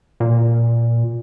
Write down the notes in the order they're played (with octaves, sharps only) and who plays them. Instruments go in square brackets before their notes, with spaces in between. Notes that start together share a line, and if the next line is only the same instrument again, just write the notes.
[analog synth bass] A#2